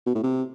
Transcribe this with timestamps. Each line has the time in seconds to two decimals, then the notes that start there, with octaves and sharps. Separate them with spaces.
0.06 B2
0.15 A2
0.23 C3